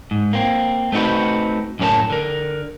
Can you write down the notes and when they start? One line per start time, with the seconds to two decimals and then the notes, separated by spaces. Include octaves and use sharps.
0.11 G#2
0.33 A#3 C4
0.92 A3 C4 D#4 F#4 B4
1.79 F#2 A2 C#4 G4 A#4 A5
2.10 D3 A#4